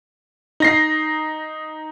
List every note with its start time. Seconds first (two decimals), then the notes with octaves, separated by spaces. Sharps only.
0.60 D#4 A#6 C7